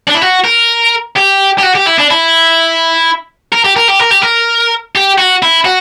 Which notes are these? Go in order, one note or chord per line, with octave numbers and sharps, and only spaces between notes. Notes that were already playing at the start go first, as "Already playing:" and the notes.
D4
E4
F#4
A#4
G4
G4
F#4
G4
E4
D4
E4
A#4
G4
A#4
G4
A#4
G4
A#4
G4
F#4
E4
F#4